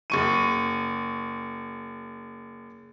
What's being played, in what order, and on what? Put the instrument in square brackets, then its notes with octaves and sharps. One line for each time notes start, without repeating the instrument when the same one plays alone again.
[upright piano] F#1 C#6 D#7